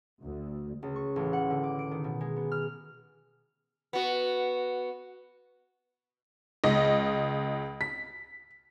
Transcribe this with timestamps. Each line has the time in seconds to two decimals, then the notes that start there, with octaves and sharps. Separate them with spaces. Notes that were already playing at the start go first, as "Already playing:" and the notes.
0.22 D2
0.83 C#2
0.96 C#6
1.16 A1
1.33 F#5
1.50 D3
1.63 D6
1.79 D7
1.91 D#3
2.04 B2
2.21 G#3
2.36 B3
2.51 F6
3.93 B3 F#4
6.64 C#2 D#5
7.81 B6